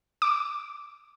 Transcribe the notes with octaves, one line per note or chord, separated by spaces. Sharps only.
D6